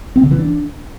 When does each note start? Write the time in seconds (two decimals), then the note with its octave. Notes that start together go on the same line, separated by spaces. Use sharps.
0.16 C4
0.23 D3
0.31 E3
0.39 D4